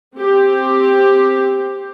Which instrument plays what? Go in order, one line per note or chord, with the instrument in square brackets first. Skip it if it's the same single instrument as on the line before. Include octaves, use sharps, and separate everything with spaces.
[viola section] C4 G4